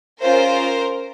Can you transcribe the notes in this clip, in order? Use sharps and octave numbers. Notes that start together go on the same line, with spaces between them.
C#4 F4 G#4 A#4 C5